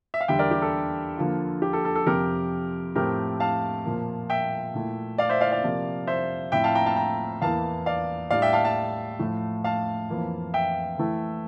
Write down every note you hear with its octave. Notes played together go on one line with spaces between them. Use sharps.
E5
F5
E2 D3 G3 E5 G5
A#4 D5
G4
A4
D3 F3 A#3 F4
G4
A4
A4
A4
F2 C3 F3 C4 G4 A#4
A2 F3 A3 C4 G4 A#4
F5 A5
A#2 F3 A#3
E5 G5
A#2 A3 E4
D5 F5
C5 E5
D5 F5
D5 F5
C3 F3 A#3
C5 E5
A2 F3 C4 E5 G5
F5 A5
G5 A#5
F5 A5
G5 A#5
E2 E3 A#3 E4 F5 A5
D5 F5
A2 G3 D4 D5 F5
E5 G5
F5 A5
F5 A5
A2 F3 A3
F5 A5
F2 E3 A#3 F4
E5 G5
E3 A3 E4